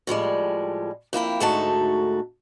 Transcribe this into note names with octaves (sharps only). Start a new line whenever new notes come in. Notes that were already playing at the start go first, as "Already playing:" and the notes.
A2 F3 G3 G#3
F2 A#3 E4 G5
D2 G#2 A3 D#4 F#4 A5